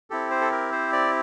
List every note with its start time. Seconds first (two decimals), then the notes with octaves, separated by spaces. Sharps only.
0.10 C4 E4 G4 A4
0.31 C5
0.41 A4
0.52 A#4
0.72 C5
0.92 D5